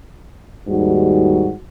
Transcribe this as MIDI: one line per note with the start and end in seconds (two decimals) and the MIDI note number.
0.68 1.53 39
0.68 1.53 44
0.68 1.53 51
0.68 1.53 55
0.68 1.53 66